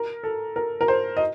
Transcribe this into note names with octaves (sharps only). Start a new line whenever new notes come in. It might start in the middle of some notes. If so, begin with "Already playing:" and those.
Already playing: A#4
A4
A#4
A#4
C5
D#5